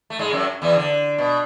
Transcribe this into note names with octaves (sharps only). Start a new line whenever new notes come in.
A3
G#2 G#3
F#2 F#3
E2 E3
D3
B2